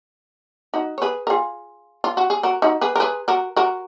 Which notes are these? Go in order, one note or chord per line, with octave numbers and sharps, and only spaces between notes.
D#4 F#4
C#5
G#4 B4
A#4
F4 G#4
F4
F#4
G#4
F#4 A#4
D#4 F#4
G#4 B4
A#4
G#4 B4
F#4 A#4
F#4 A#4